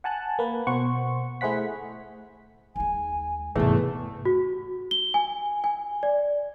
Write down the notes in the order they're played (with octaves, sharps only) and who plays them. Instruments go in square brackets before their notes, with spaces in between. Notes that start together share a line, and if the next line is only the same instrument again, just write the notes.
[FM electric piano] F#5 G#5 A5 F#6
A#3 B4
B2 C5 F#5 C#6
A3 E4 G#4 C5 F#5 B6
[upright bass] D#2 G#3 [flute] G#5
[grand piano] E2 [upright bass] G#2 C3 [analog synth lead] A3 [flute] G#4
[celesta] F#4
G7
G#5
G#5
D5